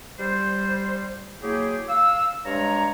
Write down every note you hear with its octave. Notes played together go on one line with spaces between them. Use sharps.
G3 C5
F#3 A#3 E4 G4 G#4
F5 E6
G2 G#3 C#5 A#5